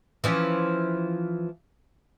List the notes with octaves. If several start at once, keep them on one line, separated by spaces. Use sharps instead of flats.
E3 F3 C#4